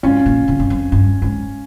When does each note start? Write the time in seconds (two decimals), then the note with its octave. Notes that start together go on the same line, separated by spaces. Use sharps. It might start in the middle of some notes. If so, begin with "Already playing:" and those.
0.03 G#2 C#4 F4
0.26 A#2
0.48 C3
0.60 G2
0.70 F2
0.92 G2
1.22 G#2